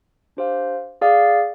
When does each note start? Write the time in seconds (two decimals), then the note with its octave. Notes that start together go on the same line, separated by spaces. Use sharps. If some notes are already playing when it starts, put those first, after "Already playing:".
0.37 D4 G4 C5 F5
1.01 G#4 D5 F5